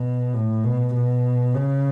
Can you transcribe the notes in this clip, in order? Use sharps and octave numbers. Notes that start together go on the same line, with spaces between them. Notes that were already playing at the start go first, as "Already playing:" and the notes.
Already playing: B2
A2
B2
B2
C#3